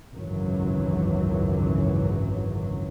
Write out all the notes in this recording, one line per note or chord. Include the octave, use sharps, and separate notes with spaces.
G#1 C#2 F#2 E3 F#3